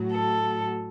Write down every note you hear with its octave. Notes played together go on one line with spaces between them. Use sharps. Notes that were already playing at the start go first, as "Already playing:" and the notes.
Already playing: A2 F#3
A4